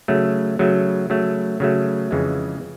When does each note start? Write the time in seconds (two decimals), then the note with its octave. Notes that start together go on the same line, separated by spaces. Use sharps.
0.08 C#3 F#3 A3
0.59 C#3 F#3 A3
1.10 C#3 F#3 A3
1.60 C#3 F#3 A3
2.11 F2 C#3 E3 G#3